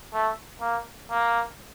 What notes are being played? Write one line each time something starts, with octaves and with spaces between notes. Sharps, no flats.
A3
A#3
A#3